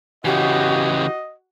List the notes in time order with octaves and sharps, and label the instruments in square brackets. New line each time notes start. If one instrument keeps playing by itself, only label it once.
[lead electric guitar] C#3 E3 [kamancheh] F#4 [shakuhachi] G4 [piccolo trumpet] D#5